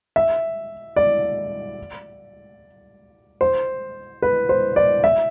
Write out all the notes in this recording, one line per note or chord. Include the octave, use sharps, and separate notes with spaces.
E5
D5
C5
B4
C5
D5
E5